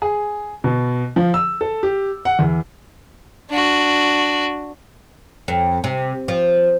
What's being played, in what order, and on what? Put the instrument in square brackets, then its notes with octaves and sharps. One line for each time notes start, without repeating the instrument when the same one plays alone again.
[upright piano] G#4
B2
F3
E6
A4
G4
F#5
E2
[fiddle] D4 F#4
[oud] F2
C3
F3